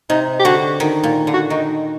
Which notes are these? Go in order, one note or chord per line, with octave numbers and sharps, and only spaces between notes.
C3 D#4
G4
D3 F#4
D#3
A#2
D3
F#4
D#3 D#4